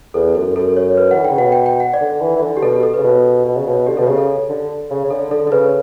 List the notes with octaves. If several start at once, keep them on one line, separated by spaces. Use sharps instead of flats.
E2 A4
F#2 A4
F#2 A4
C#5
B4
E3 F#5
D3 G5
C#3
B2 F#5
G5
G5
F#5
D5
D3
E3
E3
D3
G4
B2 A4
G4
A4
C#3 B4
B2
B2
C#3
B2
D3 G4
B2 A4
C#3 G4
A4
D3
C#3
C#3
D3 A4
D3 A4
D3 A4
C#3 B4